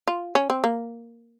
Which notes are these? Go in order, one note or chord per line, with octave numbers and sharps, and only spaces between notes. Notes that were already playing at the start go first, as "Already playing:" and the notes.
F4
C#4
C4
A#3